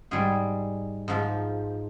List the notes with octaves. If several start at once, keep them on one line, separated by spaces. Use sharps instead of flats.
G#2 G3 G#4
G#2 F3